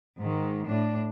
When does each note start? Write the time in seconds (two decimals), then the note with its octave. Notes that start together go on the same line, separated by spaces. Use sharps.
0.21 G#2 D#3
0.68 A2 D4